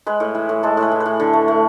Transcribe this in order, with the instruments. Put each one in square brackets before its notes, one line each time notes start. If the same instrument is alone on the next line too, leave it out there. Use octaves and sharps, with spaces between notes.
[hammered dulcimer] G#3 B4
A2
E3
A2
G#3 A4
A2
B4
E3
B4
A2
D3
A3
A3